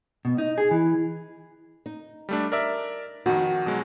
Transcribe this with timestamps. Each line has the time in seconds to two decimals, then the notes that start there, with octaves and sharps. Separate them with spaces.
0.25 B2
0.38 D#4
0.58 G#4
0.71 E3
1.86 D#4
2.29 G3 A3 D4
2.52 A#4 D5 E5
3.26 F2 D#3 F#4
3.66 B2 F#3 G#3